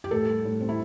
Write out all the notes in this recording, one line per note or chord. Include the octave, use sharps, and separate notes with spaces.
G4
A2 A4
G3
A2
C4
E4